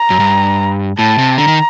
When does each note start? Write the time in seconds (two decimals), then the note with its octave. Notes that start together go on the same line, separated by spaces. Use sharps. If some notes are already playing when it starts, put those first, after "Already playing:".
Already playing: A#5
0.10 F#2
0.20 G2
0.98 A2 A5
1.18 C3
1.38 D3 A#5
1.48 D#3